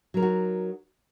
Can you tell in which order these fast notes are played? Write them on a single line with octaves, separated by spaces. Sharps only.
F#3 A#4 D#4 F#4